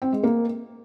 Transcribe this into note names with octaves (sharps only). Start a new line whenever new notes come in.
C4
G#3
A#3